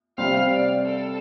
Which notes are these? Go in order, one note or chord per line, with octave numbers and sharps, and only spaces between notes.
C3 G3 C4 F5
D5
A4